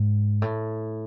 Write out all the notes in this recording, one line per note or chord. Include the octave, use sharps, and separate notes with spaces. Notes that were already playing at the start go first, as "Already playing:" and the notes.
Already playing: G#2
A2